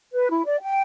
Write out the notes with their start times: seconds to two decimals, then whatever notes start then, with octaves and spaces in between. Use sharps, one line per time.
0.14 B4
0.30 E4
0.46 D5
0.62 G5